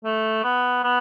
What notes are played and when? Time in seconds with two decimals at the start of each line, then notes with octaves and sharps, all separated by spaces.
0.04 A3
0.44 B3
0.84 B3